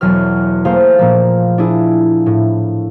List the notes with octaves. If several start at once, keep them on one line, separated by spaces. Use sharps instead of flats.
E1 E2 F#3 B4 F6
A3 A#3 G#4 C5 F5
A#2 F3 A#3
D4 E4 G#4
A2